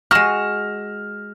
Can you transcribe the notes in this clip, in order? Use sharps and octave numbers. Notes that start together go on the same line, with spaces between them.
G#3 F#4 F6 A#6 E7